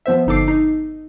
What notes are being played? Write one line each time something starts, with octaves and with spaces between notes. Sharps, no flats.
F3 B3 C5 E5
G1 D#4 A4 D6 C7
D#4